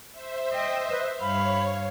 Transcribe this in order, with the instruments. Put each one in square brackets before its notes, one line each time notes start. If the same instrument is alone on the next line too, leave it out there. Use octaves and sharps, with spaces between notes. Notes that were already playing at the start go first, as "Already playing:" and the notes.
[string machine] C5 E5
[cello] D#5 [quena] G5
[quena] B4
[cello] G2 F5 [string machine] C#5 [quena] B5